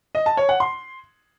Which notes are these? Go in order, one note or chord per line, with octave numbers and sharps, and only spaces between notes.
D#5
A5
C#5
F#5
C6